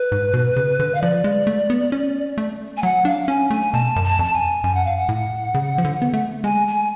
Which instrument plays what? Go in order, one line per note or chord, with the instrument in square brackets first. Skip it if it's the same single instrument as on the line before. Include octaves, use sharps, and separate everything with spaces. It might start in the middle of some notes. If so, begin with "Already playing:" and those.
Already playing: [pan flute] B4
[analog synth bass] G#2
B2
C#3
D3
[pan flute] F5
[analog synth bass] F3 [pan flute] D5
[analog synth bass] G#3
A3
B3
C#4
A3
[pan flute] G#5
[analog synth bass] F#3 [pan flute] F#5
[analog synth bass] D4 [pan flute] F5
[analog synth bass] C#4 [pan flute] G#5
[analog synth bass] A3 [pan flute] G#5
[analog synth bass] B2 [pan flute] A5
[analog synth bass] F#2
[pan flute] A5
[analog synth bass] F2 [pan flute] A5
[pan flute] G#5
[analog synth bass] F#2 [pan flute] G#5
[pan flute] F#5
F5
F#5
[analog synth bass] A2
C#3
F3
D3
B3
A3
[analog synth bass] G#3 [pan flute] G#5
[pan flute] G#5